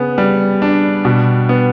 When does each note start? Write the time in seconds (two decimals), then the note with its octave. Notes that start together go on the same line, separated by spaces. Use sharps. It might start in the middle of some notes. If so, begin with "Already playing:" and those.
Already playing: C#3 B3
0.18 G3
0.62 D4
1.05 B2
1.49 B3